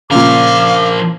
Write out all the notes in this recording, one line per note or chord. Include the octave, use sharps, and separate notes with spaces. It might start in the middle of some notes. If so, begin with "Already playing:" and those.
A#2 C#3 F3 A#4 F5 D6